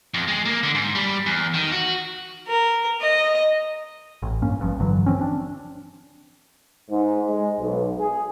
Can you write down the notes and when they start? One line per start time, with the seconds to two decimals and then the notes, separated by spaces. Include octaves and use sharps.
0.14 F2
0.28 G#3
0.45 A#3
0.63 D3
0.75 G#2
0.95 G3
1.26 E2
1.54 D#3
1.72 F#4
2.48 A#4
3.01 D#5
4.22 A1
4.42 G2 A#3 C#4
4.59 G1 G2 F3
4.80 G2 D3 E3 F#3
5.06 F3 C4 C#4
5.21 D4
6.89 G#2
7.28 G#3
7.59 B1
7.99 G#4